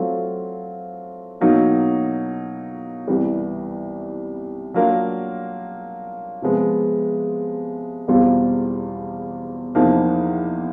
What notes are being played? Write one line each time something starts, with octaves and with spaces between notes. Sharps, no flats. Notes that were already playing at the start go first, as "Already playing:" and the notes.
Already playing: F#3 A3 C4 F4
B2 F#3 A#3 D#4
C2 C3 E3 G3 B3
F#3 A#3 D4 F4 A#4
C3 F3 G#3 B3
E2 B2 G3 C4 F4
E2 C3 F3 A#3 D#4